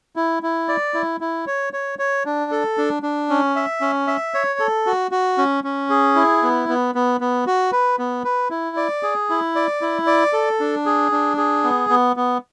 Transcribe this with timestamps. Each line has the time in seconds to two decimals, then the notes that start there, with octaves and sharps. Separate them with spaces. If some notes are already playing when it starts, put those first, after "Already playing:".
0.16 E4
0.43 E4
0.68 D5
0.94 E4
1.20 E4
1.47 C#5
1.73 C#5
1.99 C#5
2.25 D4
2.51 A4
2.78 D4
3.03 D4
3.30 C#4
3.56 E5
3.81 C#4
4.07 E5
4.34 C#5
4.59 A4
4.86 F#4
5.11 F#4
5.38 C#4
5.64 C#4
5.90 G#4
6.15 E4
6.43 B3
6.69 B3
6.95 B3
7.21 B3
7.47 F#4
7.72 B4
7.98 B3
8.24 B4
8.50 E4
8.77 D5
9.03 G#4
9.30 E4
9.55 D5
9.81 E4
10.07 D5
10.33 A4
10.60 D4
10.86 G#4
11.12 D4
11.37 G#4
11.64 B3
11.90 B3
12.16 B3